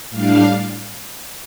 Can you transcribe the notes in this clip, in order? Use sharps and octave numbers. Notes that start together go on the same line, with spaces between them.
A2 G3 D4 F5